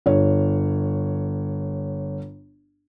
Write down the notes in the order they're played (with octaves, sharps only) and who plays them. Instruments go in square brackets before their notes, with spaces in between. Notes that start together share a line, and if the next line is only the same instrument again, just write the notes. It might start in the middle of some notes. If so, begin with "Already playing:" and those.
[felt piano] G1 C#5